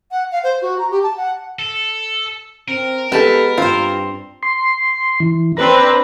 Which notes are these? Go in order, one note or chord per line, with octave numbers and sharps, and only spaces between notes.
F#5
F5
C5
F#4
A#5
G4
A5
F#5
A4
C4 A#4
G#3 B3 G4 A4 B4 A5
G2 C4 F4 C5
C6
E3
C4 D4 B4 A#5